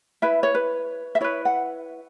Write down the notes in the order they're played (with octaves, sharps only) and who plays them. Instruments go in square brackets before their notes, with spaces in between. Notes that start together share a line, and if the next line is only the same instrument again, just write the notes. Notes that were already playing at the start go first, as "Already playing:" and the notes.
[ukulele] E4 B4 E5
C#5
B4
E5
E4 B4 C#5
F#5